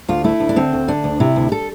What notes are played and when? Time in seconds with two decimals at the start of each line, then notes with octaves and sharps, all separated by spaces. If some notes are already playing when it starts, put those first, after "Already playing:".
0.08 D2 F4
0.24 A3 E4
0.40 D2
0.49 D4
0.56 D3 C4
0.73 D2
0.88 D3 D4
1.04 D2
1.20 C3 E4
1.36 D2
1.52 A4